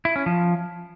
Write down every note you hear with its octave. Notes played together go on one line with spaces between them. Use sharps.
E4
C#4
F3